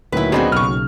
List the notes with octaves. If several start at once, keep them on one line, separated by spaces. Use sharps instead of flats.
D2 A#2 D#3 F#3 E4 B4
B3 C4 D4 D#4 F#4 G#4
B1 C#3 C#6 F6